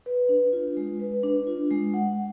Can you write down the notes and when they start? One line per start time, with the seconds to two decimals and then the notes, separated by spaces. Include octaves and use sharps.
0.06 B4
0.29 D4
0.53 F4
0.77 G#3
1.00 B4
1.23 D4
1.47 F4
1.71 G#3
1.94 F#5